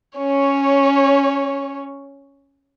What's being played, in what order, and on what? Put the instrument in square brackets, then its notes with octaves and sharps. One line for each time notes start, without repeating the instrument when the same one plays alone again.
[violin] C#4 C#5